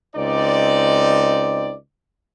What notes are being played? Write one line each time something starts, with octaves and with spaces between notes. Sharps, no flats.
C#2 C4 D#4 D5